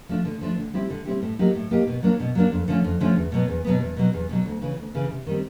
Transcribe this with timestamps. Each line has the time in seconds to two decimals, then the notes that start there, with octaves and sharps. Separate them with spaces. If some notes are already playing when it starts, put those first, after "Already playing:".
0.09 F3 A3 D4
0.25 D3
0.41 F3 A3 D4
0.57 D3
0.73 G3 C4 E4 G4
0.90 D3
1.05 G3 C4 E4 G4
1.22 A2
1.39 F#3 A#3 D#4 G4
1.55 A2
1.70 F#3 A#3 D#4 G4
1.87 B2
2.03 F#3 A#3 D4
2.20 B2
2.35 F#3 A#3 D4
2.52 F2
2.68 D3 F3 A3 C#4
2.84 F2
3.00 D3 F3 A3 C#4
3.16 E2
3.32 B2 F#3 B3
3.48 E2
3.64 B2 F#3 B3
3.81 E2
3.97 B2 F#3
4.13 E2
4.29 B2 F#3
4.46 D2
4.62 C#3 E3
4.78 D2
4.95 C#3 E3
5.10 C3
5.26 D#3 G3 C4